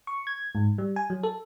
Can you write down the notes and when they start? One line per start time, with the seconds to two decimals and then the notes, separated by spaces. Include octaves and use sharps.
0.07 C#6
0.27 G#6
0.55 G#2
0.78 G3
0.96 G#5
1.10 F#3
1.23 A4